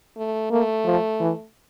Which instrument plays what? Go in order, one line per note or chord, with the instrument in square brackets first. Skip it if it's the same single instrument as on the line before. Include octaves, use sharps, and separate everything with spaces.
[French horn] A3
[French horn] A3 [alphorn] A#3
[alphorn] F3
E3